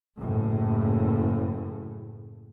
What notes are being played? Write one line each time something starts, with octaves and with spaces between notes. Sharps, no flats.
F#1 A2